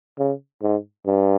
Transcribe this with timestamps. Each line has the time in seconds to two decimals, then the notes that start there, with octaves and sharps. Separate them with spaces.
0.18 C#3
0.62 G#2
1.06 G2